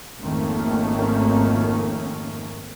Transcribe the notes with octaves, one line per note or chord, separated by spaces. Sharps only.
G#1 F2 D#3 A3 A#3 C#4